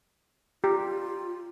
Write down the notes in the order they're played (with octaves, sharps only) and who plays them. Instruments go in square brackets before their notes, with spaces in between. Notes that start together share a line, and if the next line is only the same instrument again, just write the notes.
[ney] F4 [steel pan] G4 A#5